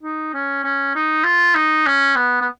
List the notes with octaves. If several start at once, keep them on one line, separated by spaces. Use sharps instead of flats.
D#4
C#4
C#4
D#4
F4
D#4
C#4
B3
B3